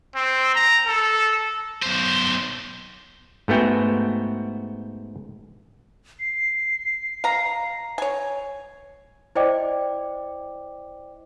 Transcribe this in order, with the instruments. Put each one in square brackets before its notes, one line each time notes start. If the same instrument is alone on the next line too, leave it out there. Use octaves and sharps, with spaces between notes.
[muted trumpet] C4
A#5
A4
[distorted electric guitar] B1 C5
[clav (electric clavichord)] G#2 A3 B3 F#4 G5
[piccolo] C7
[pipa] F5 A#5
C#5 G#5
[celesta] E4 C5 D5 D#5 G5 D6